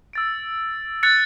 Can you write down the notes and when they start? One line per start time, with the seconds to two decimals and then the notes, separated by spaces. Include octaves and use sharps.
0.13 E6 A6 D7
1.03 F#6 A6 C#7